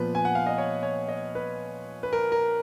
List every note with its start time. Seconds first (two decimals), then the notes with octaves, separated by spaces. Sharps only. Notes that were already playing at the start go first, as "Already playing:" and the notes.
Already playing: A#2 F3 B3 B4
0.15 G#5
0.25 F#5
0.35 F5
0.47 D#5
0.58 C#5
0.83 C#5
1.09 D#5
1.35 B4
2.03 B4
2.13 A#4
2.32 A#4